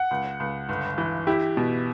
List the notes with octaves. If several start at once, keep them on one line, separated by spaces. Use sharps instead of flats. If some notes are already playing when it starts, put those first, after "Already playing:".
Already playing: F#5
C#2
C#2
G1
E3
E4 G4
B2